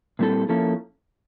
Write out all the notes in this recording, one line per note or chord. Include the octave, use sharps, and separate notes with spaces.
A#2 G3 C4 E4 A4
F3 A#3 C#4 E4 A4